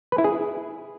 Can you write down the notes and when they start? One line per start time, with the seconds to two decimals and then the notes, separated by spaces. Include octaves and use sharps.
0.12 B4
0.18 E4
0.24 G#4